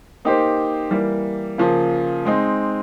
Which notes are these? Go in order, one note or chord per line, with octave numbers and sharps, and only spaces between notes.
A#3 D#4 G4 C5
E3 G3 A#3
C#3 F3 A#3
G#3 C4 D#4